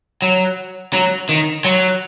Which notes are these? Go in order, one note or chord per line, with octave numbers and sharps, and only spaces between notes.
F#3
F#3
D#3
F#3